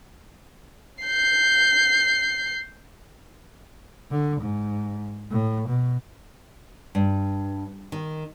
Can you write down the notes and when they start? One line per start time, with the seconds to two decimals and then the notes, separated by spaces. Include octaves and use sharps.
1.04 G6 C7
4.11 D3
4.41 G#2
5.30 A2
5.69 B2
6.95 G2
7.92 D#3